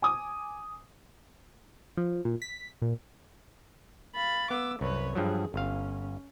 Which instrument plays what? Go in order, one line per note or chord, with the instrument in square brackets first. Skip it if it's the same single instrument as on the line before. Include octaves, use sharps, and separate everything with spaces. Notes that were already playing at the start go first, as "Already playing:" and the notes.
[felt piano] G#5 D6 D#6
[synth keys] F3
A#2
B6
A#2
[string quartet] F5 B5 A6
[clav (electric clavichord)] B3 [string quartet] D6 E6
[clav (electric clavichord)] C2 [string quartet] F#2 B4 C#5
[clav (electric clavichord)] G2 F3 F#3 [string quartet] G#4
[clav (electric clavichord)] G1 F5 [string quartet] C#4